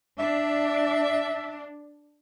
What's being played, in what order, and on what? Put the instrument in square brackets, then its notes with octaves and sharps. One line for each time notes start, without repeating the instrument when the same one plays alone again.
[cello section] D4 [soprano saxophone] E5